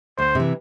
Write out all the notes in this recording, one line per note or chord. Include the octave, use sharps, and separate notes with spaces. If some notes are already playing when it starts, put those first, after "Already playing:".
D2 C5
C3 E3